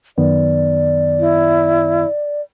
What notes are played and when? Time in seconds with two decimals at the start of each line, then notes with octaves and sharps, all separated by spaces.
0.18 F#2 D#3 B3 D5
1.20 E4